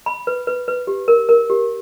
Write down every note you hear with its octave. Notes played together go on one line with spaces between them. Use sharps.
B5
B4
B4
B4
G4
A#4
A#4
G4